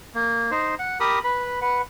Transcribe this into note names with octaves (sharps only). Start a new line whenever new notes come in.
A#3
D#4 C5
F#5
G4 A#4 B5 D#6
B4 B5
B4 F#5